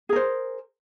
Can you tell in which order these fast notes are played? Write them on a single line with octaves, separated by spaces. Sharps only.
G#4 A#4 C5